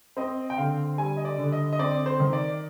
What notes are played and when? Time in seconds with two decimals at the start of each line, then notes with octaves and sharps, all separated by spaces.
0.17 C4 D#5
0.50 G5
0.58 D3 F5
0.98 G3 G#5
1.17 D#5
1.25 D5
1.38 D3
1.52 D#5
1.73 D#5
1.79 C4 D5
2.06 C5
2.20 D#3
2.33 D5